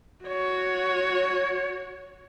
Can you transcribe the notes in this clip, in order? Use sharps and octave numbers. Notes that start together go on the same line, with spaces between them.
F#4 C#5